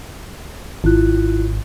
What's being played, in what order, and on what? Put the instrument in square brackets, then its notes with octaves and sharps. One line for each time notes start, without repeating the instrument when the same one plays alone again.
[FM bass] G#1 [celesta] E4 F4 F#6